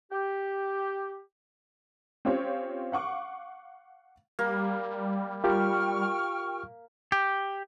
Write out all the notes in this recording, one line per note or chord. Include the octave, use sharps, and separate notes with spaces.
G4
C4 C#4 F4 G4 C5 C#5
F5 F#5 C#6 D6
G3 A#3
F4 G4 A#4 G5 C#6 F6
G4